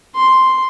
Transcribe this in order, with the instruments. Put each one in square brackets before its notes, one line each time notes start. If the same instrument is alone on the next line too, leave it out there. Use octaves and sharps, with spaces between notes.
[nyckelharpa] C6